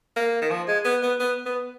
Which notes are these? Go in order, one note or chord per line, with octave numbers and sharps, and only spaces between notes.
A#3
D#3
F3
G#3
B3
B3
B3
B3